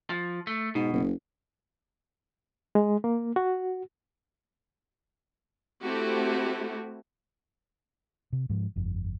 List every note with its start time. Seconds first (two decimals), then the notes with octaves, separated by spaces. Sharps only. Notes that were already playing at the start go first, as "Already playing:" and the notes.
0.10 F3
0.47 A3
0.75 G#2 B2
0.93 F#1
2.75 G#3
3.04 A#3
3.36 F#4
5.81 A3 C4 E4 F#4 G4
8.33 C3
8.50 G#2 F3
8.76 G1 F2